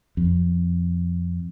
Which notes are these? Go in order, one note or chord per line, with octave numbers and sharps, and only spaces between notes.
F2